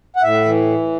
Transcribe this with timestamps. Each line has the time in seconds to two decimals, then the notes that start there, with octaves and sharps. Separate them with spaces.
0.16 F#5
0.22 A2 E5
0.45 E3